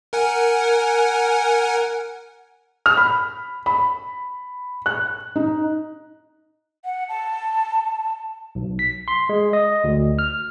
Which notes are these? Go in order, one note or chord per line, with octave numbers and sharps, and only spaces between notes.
A#4 F#5 G#5
F6
B5
B5
F#6
D#4
F#5
A5
B1
B6
C6
G#3
D#5
D2
F6